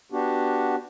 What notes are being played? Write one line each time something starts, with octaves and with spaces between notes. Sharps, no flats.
B3 D4 F#4 G4